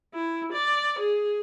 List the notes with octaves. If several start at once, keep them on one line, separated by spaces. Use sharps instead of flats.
E4
D5
G#4